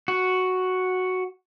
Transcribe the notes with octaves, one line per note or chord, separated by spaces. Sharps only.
F#4